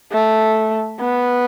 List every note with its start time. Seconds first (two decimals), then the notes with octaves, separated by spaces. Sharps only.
0.12 A3
1.00 B3